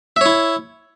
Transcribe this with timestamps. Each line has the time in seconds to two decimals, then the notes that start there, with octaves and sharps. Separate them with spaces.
0.16 E5
0.21 C#5
0.26 E4